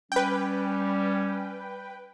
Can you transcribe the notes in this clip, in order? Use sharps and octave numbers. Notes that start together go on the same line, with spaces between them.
G3 C#4 B4 G5